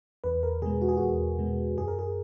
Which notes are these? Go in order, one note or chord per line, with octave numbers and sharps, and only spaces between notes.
E2 B4
A#4
B2 G#3 G#4
F#4
G#4
E2 F#4
B2 G#3
F#2 G#4
A#4
G#4